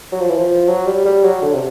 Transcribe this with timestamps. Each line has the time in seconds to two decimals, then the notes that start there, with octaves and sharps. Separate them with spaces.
0.12 F#3
0.20 F3
0.29 E3
0.38 F3
0.68 F#3
0.86 G3
1.05 G3
1.24 F#3
1.42 D3
1.54 C3